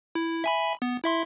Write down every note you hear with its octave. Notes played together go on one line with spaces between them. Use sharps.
E4
E5 G#5 B5
B3
E4 E5 C6